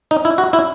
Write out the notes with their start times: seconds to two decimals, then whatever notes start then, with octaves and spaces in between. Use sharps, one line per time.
0.11 D#4
0.25 E4
0.38 F#4
0.53 E4